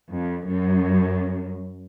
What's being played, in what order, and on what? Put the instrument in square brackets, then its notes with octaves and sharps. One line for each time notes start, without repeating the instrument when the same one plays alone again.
[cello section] F2
F#2